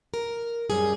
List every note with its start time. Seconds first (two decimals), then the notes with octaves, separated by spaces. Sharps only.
0.14 A#4
0.70 F#2 G3 G#4